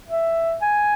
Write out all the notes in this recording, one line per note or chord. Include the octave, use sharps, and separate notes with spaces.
E5
G#5